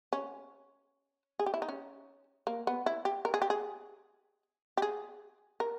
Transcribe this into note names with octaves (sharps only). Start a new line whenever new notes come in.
C#4
G#4
G4
E4
D#4
C#4
A#3
B3
E4
G4
A#4
G#4
G4
G#4
G4
G#4
A#4